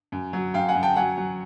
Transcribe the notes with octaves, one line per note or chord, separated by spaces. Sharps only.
F#2
F#3
F#2 F5 G5
F#5 G#5
F#2
G5 A5
F#3 F#5 G#5
F#3